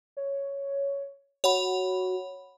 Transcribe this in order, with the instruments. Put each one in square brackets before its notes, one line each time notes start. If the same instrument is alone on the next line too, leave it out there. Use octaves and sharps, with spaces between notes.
[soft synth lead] C#5
[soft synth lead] F#4 [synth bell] C#5 F#5 B5